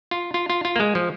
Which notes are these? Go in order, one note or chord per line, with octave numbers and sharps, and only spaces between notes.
F4
F4
F4
F4
A#3
G#3
F3